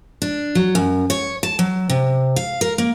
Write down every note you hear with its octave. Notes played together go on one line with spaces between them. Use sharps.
D4
F#3
F#2
C#5
A5
F#3
C3
F5
A#4
A#3